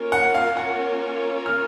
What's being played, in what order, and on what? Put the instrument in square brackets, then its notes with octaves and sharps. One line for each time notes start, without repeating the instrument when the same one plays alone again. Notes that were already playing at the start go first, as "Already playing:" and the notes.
Already playing: [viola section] A#3 C#4 F4 A#4 C#5
[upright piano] F#5
F5
F#5
F6